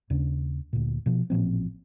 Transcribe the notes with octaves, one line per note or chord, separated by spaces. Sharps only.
D#2 C#3 D4
D2 A#2
B2 F3
A1 A#2 F3 C4